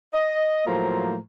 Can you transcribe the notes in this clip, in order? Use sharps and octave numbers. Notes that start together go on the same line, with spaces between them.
D#5
A2 F3 F#3 A#3 C5 A#5